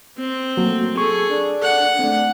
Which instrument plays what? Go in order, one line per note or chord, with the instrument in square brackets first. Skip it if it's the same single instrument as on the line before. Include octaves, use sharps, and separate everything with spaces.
[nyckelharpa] C4
[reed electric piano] F#3 A#3 F#4 [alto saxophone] A3
[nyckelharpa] G#4 [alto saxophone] A4 [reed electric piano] C#6
[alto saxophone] D4
[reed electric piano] A4 [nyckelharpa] F#5
[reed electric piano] A3 C4 [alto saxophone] D4